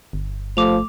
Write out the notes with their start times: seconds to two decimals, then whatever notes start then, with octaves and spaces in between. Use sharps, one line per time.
0.13 G1
0.57 F3 A3 D6 F7